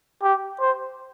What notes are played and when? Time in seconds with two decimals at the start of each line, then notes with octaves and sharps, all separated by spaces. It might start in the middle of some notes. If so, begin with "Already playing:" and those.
0.23 G4
0.60 C5